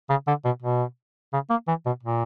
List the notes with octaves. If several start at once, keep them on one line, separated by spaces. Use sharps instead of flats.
C#3
D3
B2
B2
C#3
A#3
E3
B2
A#2